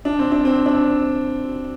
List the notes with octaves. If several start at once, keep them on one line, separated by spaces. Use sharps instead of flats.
D4
C4
D4
C4
D4